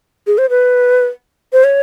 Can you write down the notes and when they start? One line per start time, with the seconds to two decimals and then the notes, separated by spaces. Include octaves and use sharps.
0.27 G#4
0.38 C5
0.50 B4
1.53 C5
1.64 C#5